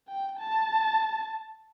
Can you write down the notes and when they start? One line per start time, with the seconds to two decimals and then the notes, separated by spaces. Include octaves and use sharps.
0.08 G5
0.39 A5